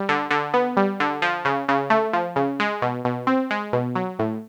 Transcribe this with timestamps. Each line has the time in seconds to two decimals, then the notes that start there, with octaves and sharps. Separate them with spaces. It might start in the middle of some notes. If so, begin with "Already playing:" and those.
Already playing: G3
0.09 D3
0.30 D3
0.54 B3
0.77 G3
1.00 D3
1.22 F3
1.45 C#3
1.69 C#3
1.90 A3
2.13 F3
2.36 C#3
2.60 G#3
2.82 B2
3.05 B2
3.27 C4
3.51 G#3
3.73 B2
3.95 F#3
4.19 A2